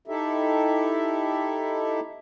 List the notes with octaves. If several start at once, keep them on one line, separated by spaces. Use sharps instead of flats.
D#4 E4 G4 A4 E5